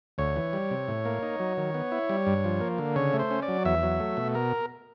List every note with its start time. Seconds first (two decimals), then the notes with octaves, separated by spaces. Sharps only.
0.18 D2 C#5
0.36 E3
0.53 G3
0.71 C3
0.88 A2
1.05 A#3
1.22 D#4
1.40 F#3
1.57 D#3
1.74 B3
1.92 E4
2.10 G3
2.27 G2
2.44 F3
2.61 A#3
2.78 D3
2.96 C#3 C#5
3.13 A3
3.19 C5
3.31 C#4
3.42 D5
3.48 F#3
3.65 E2 E5
3.83 F#3
4.00 A3
4.17 B2
4.35 A#4